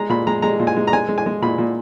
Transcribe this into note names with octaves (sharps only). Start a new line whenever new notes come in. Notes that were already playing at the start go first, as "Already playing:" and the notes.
Already playing: G#3 A#5
A#2 B5
G#3 A#5
G#3 A#5
A#2
G#5
G#3
A#5
G#3 G#5
G#3
G#5
G#3
A#2 B5
A#2